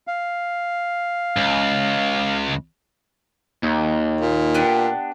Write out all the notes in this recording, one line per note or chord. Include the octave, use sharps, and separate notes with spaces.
F5
C#2
D#2
A#2
B3 D4 G4